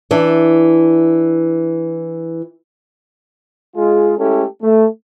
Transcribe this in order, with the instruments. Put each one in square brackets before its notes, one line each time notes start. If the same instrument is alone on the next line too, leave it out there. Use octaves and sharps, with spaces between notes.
[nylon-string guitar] E3 D4
[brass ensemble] G#3 F4 G#4
G#3 A3 C#4 E4 G4 A4
A3